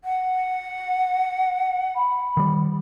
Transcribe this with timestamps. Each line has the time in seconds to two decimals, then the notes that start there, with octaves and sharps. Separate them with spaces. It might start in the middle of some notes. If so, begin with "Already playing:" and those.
0.04 F#5
1.96 B5
2.37 D#3 G3